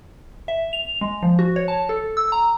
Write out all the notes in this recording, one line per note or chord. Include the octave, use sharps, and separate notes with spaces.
E5
F7
G#3
F3
F#4
C#5
A5
A4
E6
A#5